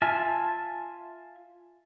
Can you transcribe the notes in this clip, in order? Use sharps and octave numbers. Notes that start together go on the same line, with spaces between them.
F4 E5 G#5 A5 F6